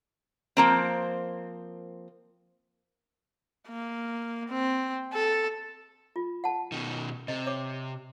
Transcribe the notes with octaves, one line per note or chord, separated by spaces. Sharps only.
F3 A#3 C4
A#3
C4
A4
F4
F#5 A5
B2 D#3
C3 D#5
C#5 D6